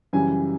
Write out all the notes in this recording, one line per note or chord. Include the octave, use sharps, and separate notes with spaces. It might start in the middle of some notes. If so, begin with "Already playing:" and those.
F#2 C#3 E3 G3 G#5